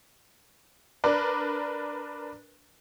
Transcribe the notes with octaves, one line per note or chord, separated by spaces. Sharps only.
D4 A#4 B4 D5